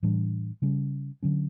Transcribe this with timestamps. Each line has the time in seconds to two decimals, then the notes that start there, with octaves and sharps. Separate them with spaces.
0.03 A2 E3 G3 D4
0.62 C#3 G3 C#4
1.23 D3 F#3 C#4